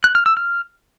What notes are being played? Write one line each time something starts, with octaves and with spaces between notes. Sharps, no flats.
F#6
F6
E6
F6